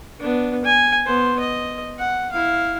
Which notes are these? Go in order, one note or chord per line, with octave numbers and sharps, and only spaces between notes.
B3 D4
G#5
B3 C5
D#5
F#5
E4 F5